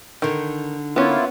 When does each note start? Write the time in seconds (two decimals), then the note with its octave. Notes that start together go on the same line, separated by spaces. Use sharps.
0.22 D3 D#3 D#4
0.96 A#3 B3 C#4 E4 F4